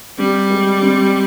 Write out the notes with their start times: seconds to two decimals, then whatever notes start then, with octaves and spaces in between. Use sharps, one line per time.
0.18 G3 C4
0.50 G#3
0.82 C4